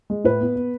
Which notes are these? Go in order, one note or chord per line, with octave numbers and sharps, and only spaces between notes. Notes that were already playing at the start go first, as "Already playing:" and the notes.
G#3
A2 B4
B3
B3